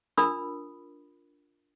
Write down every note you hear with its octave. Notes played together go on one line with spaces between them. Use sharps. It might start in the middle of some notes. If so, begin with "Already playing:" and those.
D4 F4 A#4 B5 D#6 E6